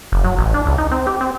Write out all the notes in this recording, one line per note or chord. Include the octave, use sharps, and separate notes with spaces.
F#1
F#3
A1
D4
C#2
D#4
C4
G4
C4